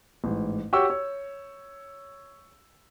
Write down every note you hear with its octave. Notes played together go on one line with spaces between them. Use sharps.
A1 G#2
F#4 G4 C#5 G5 C#6 E6
C#5